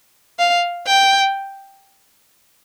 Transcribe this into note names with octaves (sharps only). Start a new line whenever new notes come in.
F5
G5